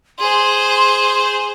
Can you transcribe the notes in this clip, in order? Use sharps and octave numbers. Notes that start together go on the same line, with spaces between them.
G#4 C5 C6